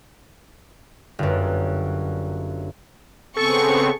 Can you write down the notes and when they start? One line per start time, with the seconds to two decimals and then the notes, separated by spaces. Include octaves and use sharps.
1.19 G1 F#2
3.36 C#3 B3 C4 G#4 A4 C#6